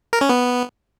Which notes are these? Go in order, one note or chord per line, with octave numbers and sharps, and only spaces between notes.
A#4
C#4
B3